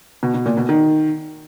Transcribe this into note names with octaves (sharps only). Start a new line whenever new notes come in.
B2
B2
A#2
B2
D#3